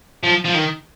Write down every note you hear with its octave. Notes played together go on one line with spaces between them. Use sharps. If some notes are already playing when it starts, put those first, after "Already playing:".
F3
F3
D#3